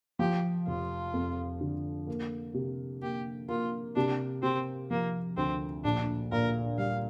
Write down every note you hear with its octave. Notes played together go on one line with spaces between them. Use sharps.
F3 G4
F1 F4
F2
D3
A#3
C3
A#3 G4
A#3 F4
C3 D4
C3 C4
F3 A#3
D2 C4
A#1 D4
A#2 A#4
G3 F5